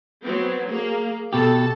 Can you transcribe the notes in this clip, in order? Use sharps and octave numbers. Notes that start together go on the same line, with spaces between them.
F#3 B3 C4
A#3 G#4
B2 G4 A4 A5